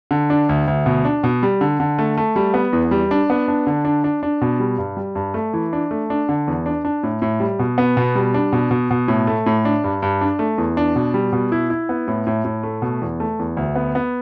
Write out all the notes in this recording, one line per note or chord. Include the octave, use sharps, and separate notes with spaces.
D3
D4
D2
D2
B2
D4
B2
G3
D3
D3
A3
A3
G3
B3
E2
G3
D4
B3
D4
D3
D4
D4
D4
B2
G3
G2
G3
G2
A3
E3
D4
A3
D4
D3
E2
D4
D4
A2
A2
G3
B2
B3
B2
G3
D4
B2
B2
B2
A2
A3
A2
D4
G2
G2
D4
A3
E2
D4
B2
G3
B2
E4
E4
B3
A2
A2
A2
A3
B2
E2
A3
E2
D2
B3
B3